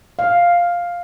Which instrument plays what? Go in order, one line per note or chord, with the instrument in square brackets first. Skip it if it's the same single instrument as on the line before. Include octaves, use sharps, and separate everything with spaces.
[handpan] F5